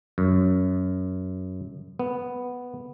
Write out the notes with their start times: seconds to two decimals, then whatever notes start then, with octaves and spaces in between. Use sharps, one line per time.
0.18 F#2
1.99 B3